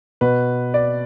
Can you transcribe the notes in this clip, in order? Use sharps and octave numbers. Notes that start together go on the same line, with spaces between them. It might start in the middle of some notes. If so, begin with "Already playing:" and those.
B2 B4
D5